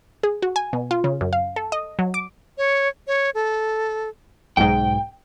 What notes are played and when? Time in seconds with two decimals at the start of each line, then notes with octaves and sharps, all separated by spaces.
0.23 G#4
0.42 F#4
0.56 G#5
0.73 B2
0.91 F4
1.04 C#3
1.21 F#2
1.33 F5
1.56 A4
1.72 D#5
1.99 F#3
2.14 D6
2.58 C#5
3.07 C#5
3.34 A4
4.57 B1 G#2 G5